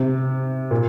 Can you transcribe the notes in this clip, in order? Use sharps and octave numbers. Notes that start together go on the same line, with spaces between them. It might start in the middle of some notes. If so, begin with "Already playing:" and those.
Already playing: C3
A#2